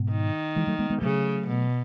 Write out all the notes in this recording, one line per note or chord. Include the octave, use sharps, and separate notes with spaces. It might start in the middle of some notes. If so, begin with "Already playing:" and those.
Already playing: G#2 B2
D#3
E3 G#3
F#3 A3
G#3 B3
G#3 B3
C#3 F#3 A3
B2